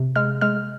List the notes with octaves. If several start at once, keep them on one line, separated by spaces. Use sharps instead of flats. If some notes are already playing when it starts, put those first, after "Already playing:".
Already playing: C3
G#3 F6
G#3 F6